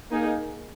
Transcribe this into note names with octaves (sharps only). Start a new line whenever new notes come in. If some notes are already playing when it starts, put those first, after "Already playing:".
A#3 D#4 G#4